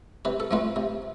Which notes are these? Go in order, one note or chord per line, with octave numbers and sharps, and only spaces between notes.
C3 B4
A4
F3 A3 C4 B4
C3